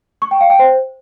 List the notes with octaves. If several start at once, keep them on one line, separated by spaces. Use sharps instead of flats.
C#6
G5
F5
G5
C5